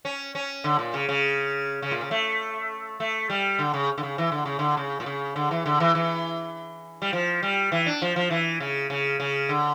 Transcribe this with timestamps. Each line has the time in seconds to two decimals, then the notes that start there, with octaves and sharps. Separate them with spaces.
0.05 C#4
0.35 C#4
0.64 D3
0.79 A#2
0.94 C#3
1.09 C#3
1.82 C#3
1.91 A#2
2.01 C#3
2.11 A3
3.00 A3
3.30 G3
3.59 D3
3.74 C#3
3.98 D3
4.03 C#3
4.18 E3
4.32 D3
4.45 C#3
4.59 D3
4.77 C#3
5.00 A#2
5.06 C#3
5.36 D3
5.51 E3
5.66 D3
5.80 E3
5.95 E3
7.02 G3
7.13 F3
7.43 G3
7.72 E3
7.86 D4
8.02 F3
8.16 F3
8.30 E3
8.60 C#3
8.90 C#3
9.20 C#3
9.49 D3